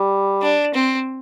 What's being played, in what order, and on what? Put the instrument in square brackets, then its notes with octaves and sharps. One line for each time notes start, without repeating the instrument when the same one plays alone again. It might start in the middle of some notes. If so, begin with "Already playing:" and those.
Already playing: [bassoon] G3
[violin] D4
C4